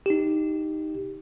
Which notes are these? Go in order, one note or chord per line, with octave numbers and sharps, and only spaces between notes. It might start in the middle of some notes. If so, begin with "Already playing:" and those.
D#4 G4